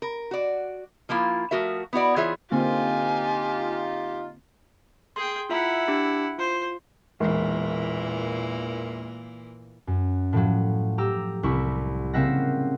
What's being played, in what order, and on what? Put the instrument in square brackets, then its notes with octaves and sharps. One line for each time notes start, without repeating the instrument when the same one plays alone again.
[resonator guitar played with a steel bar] A#4
F#4 D5
F3 A#3 E4 F4
F3 A3 F#4 A#4 E5
B3 E4 F#4 D5
E3 F4 G#4 C#5 E5
[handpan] D3 A#3 C4 [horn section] D#4 F4 [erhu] G4 [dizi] G#5
[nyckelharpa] G#4 G5 [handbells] C6
[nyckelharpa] E4 F#5 [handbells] F4 E5 A#5
[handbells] D4 G4
[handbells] F4 [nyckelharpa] C5
[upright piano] E1 [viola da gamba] A#2 E3 A#3
[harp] F#2
A2 F3 F#3
G4 A#5 E6
C2 E4 C#6
C#3 A#3 C4 E5 F#5 A#6